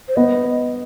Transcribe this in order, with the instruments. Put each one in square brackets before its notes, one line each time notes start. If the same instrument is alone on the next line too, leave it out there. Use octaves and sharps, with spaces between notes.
[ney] C5
[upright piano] B3 [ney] D#5